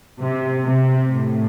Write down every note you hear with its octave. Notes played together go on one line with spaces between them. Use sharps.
C3
C3
A2